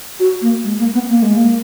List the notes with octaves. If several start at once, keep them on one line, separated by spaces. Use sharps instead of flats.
F#4
A#3
G#3
A#3
B3
A#3
G#3
A#3